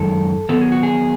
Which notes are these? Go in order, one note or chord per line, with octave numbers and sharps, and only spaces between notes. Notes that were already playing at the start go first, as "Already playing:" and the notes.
Already playing: F#2 D#3 G#3 A4
D#3 F#3 B3 A4
G#4
F#4
G#4